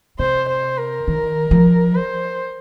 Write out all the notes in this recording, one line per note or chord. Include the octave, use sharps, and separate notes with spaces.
C3 C5
C5
A#4
D#3
F3
C5